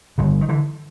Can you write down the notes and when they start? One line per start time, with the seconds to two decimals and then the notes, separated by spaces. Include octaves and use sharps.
0.18 G1 G2 D3 D#3
0.41 D#3
0.49 D3 E3